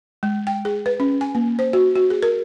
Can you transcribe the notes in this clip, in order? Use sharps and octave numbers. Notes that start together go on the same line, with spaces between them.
G#3
G5
G#4
B4
C#4
G#5
A#3
C5
F#4
F#4
G#4
A#4